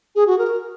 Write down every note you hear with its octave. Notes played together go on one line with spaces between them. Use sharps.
G#4
F#4
A#4